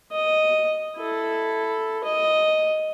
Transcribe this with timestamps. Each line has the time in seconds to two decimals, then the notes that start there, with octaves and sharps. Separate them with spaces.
0.12 D#5
0.97 E4 A4
2.04 D#5